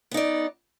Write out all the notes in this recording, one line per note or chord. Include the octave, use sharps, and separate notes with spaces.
B3 D#4 D5